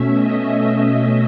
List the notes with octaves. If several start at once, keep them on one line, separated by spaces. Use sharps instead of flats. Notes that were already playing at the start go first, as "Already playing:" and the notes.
Already playing: B2 A3 C#4 E5
D#5